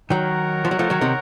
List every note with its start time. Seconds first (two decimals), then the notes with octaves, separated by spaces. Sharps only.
0.10 D#3 F#3 D#4 A#4 C#5 F#5
0.65 F3
0.71 F#3
0.79 F3 A3
0.90 D#3 F#3
1.01 C3 D#3